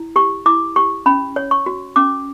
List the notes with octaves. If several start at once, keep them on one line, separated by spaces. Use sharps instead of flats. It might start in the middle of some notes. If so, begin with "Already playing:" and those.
Already playing: E4
G4 C#6
E4 D6
G4 C#6
C#4 B5
C#5
C#6
F#4
C#4 D6